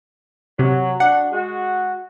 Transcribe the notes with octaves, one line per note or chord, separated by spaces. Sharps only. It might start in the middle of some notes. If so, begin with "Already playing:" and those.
C3 F#3
D4 F#4 F#5
G#3 F#4